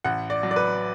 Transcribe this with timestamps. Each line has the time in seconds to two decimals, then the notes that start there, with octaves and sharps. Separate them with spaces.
0.04 A1 F#5
0.30 D5
0.43 F#3
0.51 D5
0.56 B4